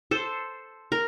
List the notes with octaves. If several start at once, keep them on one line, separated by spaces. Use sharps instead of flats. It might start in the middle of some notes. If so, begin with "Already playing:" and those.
A4 C5
A#4